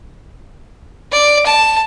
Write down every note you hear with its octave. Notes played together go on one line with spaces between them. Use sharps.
D5
A5